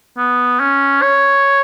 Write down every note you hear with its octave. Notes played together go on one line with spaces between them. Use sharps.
B3
C#4
C#5